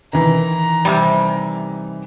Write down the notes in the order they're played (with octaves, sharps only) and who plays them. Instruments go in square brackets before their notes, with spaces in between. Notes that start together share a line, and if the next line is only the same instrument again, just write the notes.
[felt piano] D#3 E3 [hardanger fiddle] A#5
[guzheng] C3 G3